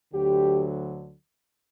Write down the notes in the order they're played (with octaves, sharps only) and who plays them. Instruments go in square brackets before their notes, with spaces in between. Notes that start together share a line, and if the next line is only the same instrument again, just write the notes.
[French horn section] D2 D3 F#3 G4